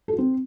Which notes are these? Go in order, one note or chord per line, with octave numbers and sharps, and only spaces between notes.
A4
F#4
C4